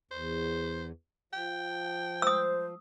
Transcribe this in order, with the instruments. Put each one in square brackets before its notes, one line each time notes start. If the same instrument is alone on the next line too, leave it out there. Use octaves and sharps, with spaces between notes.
[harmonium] E2 [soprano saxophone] C5
[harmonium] F3 [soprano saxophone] G5
[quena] C5 [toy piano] D#6 E6